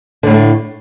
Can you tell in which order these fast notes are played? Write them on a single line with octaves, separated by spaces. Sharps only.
D3 A2 G3 A3